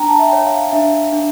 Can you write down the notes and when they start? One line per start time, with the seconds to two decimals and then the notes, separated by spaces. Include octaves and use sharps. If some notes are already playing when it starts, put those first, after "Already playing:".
Already playing: D4 G5 A#5
0.08 A5
0.19 E5 G5
0.33 C#5
0.46 F5
0.72 D4 E5
1.12 D4